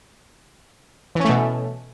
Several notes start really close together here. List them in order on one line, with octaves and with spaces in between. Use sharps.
E3 C#4 A3 B2